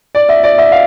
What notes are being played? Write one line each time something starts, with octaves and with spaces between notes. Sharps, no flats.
D5
E5
D5
E5
F5